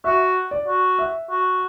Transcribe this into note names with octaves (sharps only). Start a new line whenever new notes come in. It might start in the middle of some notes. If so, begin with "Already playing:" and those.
F#4 E5
D5
F#4
E5
F#4